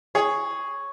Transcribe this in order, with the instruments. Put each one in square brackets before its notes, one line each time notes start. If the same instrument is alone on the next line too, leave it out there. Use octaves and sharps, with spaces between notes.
[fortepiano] G#4 [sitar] C#5